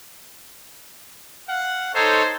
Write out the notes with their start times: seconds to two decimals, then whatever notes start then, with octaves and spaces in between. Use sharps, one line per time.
1.48 F5 F#5
1.94 D#4 A4 C5 C#5